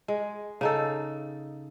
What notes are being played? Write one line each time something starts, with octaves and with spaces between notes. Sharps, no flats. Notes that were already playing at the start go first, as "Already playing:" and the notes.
G#3
C#3 D#4 A4